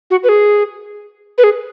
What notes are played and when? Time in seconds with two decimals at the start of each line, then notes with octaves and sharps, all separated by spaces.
0.10 F#4
0.23 B4
0.29 G#4
1.38 B4
1.44 G#4